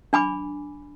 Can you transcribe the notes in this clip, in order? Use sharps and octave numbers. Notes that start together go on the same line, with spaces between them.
D4 G#5 B5 D6